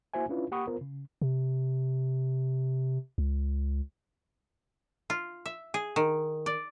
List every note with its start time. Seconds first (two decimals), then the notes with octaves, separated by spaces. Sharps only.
0.14 A#3 E4 F#4 C5 E5 G#5
0.29 C#4 D4 E4 F4 B4
0.51 A#3 G4 F#5 B5 C#6 D#6
0.67 B3 F4 A#4 C5
0.81 C#3
1.22 C3
3.18 C#2
5.10 F4
5.46 E5
5.74 G#4
5.96 D#3
6.46 D5